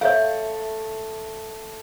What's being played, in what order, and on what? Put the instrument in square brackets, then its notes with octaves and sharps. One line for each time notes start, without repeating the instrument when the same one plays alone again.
[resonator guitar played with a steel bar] A3 [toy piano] C#5 E5 F5